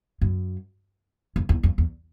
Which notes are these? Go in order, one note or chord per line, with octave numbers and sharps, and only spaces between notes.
F#2
F2
E2
F2
E2